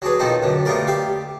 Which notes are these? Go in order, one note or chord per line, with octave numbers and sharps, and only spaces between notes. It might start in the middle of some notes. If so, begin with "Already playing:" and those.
F#3 D4 G#4 B4
B2 D#3 F3 C4 D#4 A4
F#2 D3
A3 B3 F4 G4 A#4 D5
G4 E5 F5